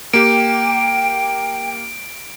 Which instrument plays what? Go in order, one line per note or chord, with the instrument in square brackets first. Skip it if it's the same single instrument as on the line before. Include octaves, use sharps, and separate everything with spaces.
[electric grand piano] A#3 G4 [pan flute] G5 [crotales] D7